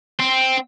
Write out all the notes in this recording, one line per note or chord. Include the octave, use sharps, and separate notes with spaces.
C4